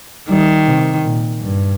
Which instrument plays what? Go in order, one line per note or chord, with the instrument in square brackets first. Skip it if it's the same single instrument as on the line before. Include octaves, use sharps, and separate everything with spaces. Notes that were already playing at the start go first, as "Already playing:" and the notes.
[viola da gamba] D#3 [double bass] G3
[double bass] C3
A#2
G2